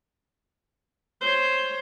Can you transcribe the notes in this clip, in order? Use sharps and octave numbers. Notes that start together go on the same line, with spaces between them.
C5 C#5